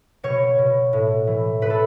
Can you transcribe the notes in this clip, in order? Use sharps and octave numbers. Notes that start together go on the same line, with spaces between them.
B2 C#5
B2
A2
E3
A2 B4
A4